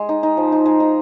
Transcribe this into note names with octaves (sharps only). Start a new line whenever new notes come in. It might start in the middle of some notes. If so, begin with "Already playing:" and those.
Already playing: G#3
D#4
D#4
F3
D#4
G#3
D#4